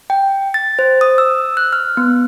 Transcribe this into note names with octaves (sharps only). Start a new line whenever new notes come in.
G5
A6
C5
D#6
E6
F#6
F6
B3